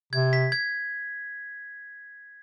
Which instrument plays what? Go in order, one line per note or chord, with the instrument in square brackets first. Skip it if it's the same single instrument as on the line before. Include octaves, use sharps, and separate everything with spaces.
[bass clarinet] C3 [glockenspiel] G#6
[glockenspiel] B6
G#6